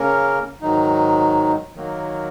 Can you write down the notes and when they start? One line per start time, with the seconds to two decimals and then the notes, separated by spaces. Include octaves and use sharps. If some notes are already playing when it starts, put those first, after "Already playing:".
Already playing: C#3 A#3 C#4 A#4
0.61 G#2 D#3 F#3 D#4
1.75 D#3 F#3 A#3